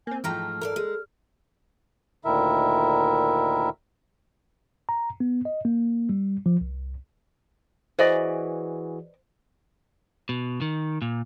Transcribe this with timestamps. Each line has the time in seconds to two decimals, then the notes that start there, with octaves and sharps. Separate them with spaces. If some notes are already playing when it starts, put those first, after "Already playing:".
0.07 A#3 C4 G#5
0.24 G#2 E3 F3 A3 G5 A#5 F6
0.61 G#2 F3 A4 A#4 D5
0.76 G#3
2.25 D2 A#2 D#3 E4 A#4 E5
4.89 A#5
5.20 B3
5.45 D#5
5.65 A#3
6.09 G3
6.46 F3
6.61 C2
7.99 E3 F#4 G#4 B4 C5 D5 D#5
10.29 B2
10.61 D#3
11.02 A#2